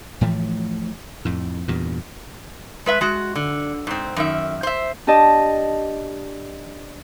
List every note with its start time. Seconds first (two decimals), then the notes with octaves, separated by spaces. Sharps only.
0.21 A2 E3 F3 A3
1.25 F2 A2
1.68 E2 G2 A#2
2.86 G#3 B4 E5
3.01 G#3 F#4
3.35 D3
3.87 G#2 C4
4.16 F#2 D#3 E5
4.63 C5 E5
5.07 D4 G4 D5 D#5 A5